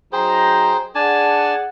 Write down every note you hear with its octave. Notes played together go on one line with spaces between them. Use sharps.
F#3 D#4 G#4 C5 G5 A#5
D4 G#4 F#5 G#5 A5